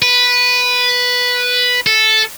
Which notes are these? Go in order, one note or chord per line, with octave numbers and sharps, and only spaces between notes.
B4
A4